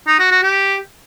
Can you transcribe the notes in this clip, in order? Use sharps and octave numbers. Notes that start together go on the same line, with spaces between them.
D#4
F#4
F#4
G4